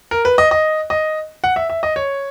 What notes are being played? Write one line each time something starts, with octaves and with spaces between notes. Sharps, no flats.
A#4
B4
D#5
D#5
D#5
F#5
E5
E5
D#5
C#5